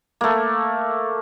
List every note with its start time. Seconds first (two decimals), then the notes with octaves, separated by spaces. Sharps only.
0.21 A3 A#3